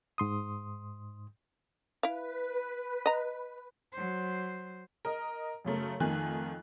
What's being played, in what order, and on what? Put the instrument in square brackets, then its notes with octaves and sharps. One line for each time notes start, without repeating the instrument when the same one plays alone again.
[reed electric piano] G#2 C6 D#6
[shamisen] E4 F5 [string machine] B4
[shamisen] D#5 A#5
[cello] F#3 C5
[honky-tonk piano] A#4 D#5
F#2 C#3 A3 A#4
F2 D#3 A3 G#5 F#6